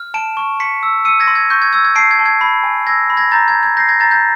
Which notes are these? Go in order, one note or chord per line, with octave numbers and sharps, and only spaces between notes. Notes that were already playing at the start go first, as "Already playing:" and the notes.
Already playing: F6
A5 D7 E7
C#6
C6 B6 C#7
E6
E6 C#7 D#7
G#6 A#6
C6
G#6
C#6 G6
G#6
E6 G#6
G#6
A5 C7 D7
G#6
A5
G#6
B5
G#5
E6 G#6 A#6
B5
G#6 A#6
A#5 G6 A6
G#6
G6
G#6
G6 A#6 C7
G#6 A#6
A#5 G6 A6
G6 A6